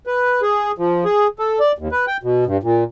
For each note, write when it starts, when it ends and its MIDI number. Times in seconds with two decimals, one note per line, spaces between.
0.07 0.41 71
0.42 0.72 68
0.78 1.04 53
1.05 1.27 68
1.39 1.59 69
1.60 1.72 74
1.79 1.88 39
1.92 2.06 71
2.07 2.17 79
2.23 2.44 47
2.46 2.57 43
2.63 2.84 46